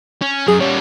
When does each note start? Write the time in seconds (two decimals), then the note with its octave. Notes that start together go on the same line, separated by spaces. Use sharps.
0.22 C#4
0.48 F#2 G#4
0.60 G3 C#4 C#5